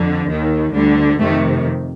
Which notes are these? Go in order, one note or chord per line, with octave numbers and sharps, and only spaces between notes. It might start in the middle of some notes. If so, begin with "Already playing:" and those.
Already playing: F2 D3
D#2 D#3
D2 D3 G3
F2 C3 D#3 A3